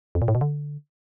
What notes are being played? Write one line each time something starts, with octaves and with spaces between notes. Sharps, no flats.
F2
A#2
A2
B2
D3